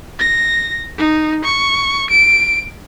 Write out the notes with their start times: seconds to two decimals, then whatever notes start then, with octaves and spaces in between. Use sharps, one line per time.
0.19 A#6
0.98 D#4
1.44 C#6
2.10 D7